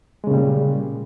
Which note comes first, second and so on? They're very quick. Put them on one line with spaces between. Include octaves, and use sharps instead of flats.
G#3 C#3 A#2 G3